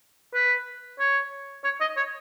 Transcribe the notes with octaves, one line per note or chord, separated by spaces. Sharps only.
B4
C#5
C#5
D#5
C#5